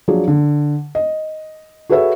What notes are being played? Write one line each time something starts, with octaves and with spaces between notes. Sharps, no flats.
F3 F#3 D4 G#4
D3
D#5
F#4 G#4 A4 B4 C#5 E5